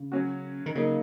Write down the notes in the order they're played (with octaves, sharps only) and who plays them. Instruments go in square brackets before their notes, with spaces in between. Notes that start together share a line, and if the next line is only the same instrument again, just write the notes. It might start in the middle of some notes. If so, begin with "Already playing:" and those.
Already playing: [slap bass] C#3
[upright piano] F#3 C#4 F#4
[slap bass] D#3
[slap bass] C#3 [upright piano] F#3 A#3 D#4